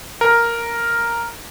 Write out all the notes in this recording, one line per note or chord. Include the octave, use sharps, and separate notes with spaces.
A#4